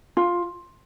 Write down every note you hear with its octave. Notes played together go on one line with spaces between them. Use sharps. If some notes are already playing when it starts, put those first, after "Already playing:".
F4